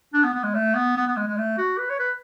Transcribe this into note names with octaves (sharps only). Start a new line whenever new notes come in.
D4
B3
B3
G#3
A3
B3
B3
B3
G#3
G#3
A3
F#4
B4
C#5
B4